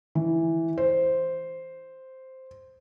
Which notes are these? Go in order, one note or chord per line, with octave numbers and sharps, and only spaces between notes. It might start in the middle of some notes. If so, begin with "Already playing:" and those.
E3
C5